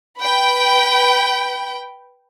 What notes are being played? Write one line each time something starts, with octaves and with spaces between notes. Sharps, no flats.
B4 G5 B5